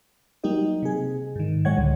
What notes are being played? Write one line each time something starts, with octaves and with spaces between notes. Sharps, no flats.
F#3 G3 A#3 D#4 G4 D#5
C3 G#4
G#2 D#3
A2 G3 G#3 C#5 F#5 G#6
C#2 D3